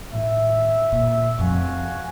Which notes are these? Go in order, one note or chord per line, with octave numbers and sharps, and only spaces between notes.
A2 D#3 E5
A#2
F1 F2 F#4 F5 G#5